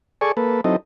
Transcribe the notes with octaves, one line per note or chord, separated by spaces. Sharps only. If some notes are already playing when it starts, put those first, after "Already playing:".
G#4 A4 D5 G#5 C#6
A#3 A4 B4
F#3 C4 D#4 E4 A4 D#5